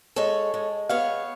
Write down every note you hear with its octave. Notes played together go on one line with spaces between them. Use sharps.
G#3 A4 C#5
G#3
B3 C#5 F5